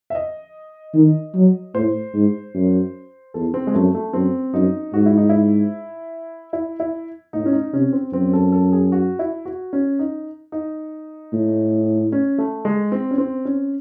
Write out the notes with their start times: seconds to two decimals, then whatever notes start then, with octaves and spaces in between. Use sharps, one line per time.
0.10 E5
0.15 D#5
0.94 D#3
1.35 F#3
1.74 A2 C5
2.14 G#2
2.54 F#2
3.34 E2 A4
3.54 C4
3.67 G#3
3.74 F#2 A3
3.95 A3
4.13 F#2 C4
4.54 F#2 D#4
4.93 G#2 F#4
5.06 E4
5.17 D#4
5.29 E4
6.53 E4
6.80 E4
7.33 A2 D#4
7.46 C#4
7.53 D#4
7.73 C3 C#4
7.93 C4
8.13 F#2 C4
8.33 A4
8.52 A4
8.72 G#4
8.92 F#4
9.19 E4
9.45 F#4
9.73 C#4
9.99 D#4
10.52 D#4
11.32 A2
12.12 C#4
12.38 A3
12.65 G#3
12.92 C4
13.11 C#4
13.18 C4
13.45 C#4